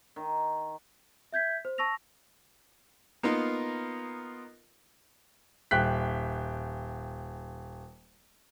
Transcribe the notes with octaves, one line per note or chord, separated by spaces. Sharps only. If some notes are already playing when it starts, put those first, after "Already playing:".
D#3
E5 G6 G#6 B6
C5
A5 C#6 E6 A#6 F7
A#3 B3 D#4 F4 A#4
D#1 G5 F#6 B6